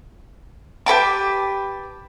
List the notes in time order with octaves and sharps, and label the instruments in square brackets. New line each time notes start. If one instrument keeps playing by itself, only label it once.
[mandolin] G4 B4 A5 D6